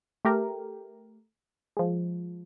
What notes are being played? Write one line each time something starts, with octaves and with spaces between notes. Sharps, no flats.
A3 G4 A#4
F3 G#3